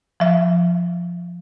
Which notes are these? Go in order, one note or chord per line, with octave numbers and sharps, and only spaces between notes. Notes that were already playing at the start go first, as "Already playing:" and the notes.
F3 E5